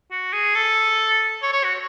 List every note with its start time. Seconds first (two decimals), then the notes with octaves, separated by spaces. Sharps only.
0.11 F#4
0.33 G#4
0.55 A4
1.42 C#5
1.52 C#5
1.64 F#4